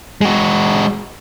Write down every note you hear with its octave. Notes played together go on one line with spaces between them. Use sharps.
G#3 F#4